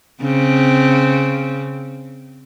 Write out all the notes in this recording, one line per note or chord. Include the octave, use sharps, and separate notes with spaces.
C#3 C4